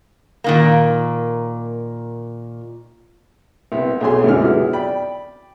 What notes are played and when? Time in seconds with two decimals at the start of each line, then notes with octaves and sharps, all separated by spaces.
0.44 A#2 D#3 A#3
3.72 C2 B2 B3
4.01 B1 G#4 C#5 G#5 C6
4.24 C#2 F#2 D3 E3 D#4 F6
4.42 B2 F#3 B3 E4 G#4
4.73 D5 G5 B5